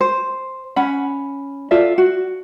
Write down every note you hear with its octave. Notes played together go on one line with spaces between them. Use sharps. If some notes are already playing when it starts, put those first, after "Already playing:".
C5
C#4 F#5 B5
F4 A4 D5 E5
F#4